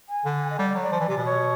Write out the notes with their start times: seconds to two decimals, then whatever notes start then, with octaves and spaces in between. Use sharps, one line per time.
0.09 G#5
0.25 D3
0.50 D#5
0.58 G3 D5
0.69 D5
0.75 F#3
0.81 D5
0.92 F3
1.00 E3
1.08 C3
1.17 B2
1.25 C#5